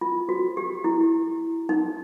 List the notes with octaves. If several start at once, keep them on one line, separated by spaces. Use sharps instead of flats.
F4
F#4
G4
E4
D#4